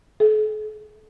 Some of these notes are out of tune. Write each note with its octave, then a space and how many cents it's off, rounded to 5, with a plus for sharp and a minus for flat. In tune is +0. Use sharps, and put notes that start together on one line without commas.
A4 -45